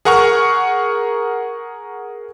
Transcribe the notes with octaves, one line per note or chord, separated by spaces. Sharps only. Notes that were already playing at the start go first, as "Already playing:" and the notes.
G#4 A#4 F#5 A#5 C#6 F6